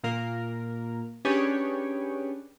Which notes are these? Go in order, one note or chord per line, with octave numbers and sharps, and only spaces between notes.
A#2 A#3 A#4
C#4 D4 G4 G#4 B4 C#5